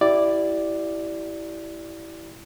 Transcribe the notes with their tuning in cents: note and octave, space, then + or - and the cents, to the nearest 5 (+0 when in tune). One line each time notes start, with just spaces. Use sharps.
E4 +0 G4 -30 D5 +0